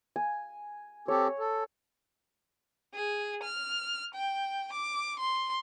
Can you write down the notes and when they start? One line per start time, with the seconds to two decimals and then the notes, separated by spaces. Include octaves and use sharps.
0.16 G#5
1.08 C4 G4 A4 C#5
1.39 A4
2.95 G#4
3.43 F6
4.14 G5
4.73 D6
5.19 C6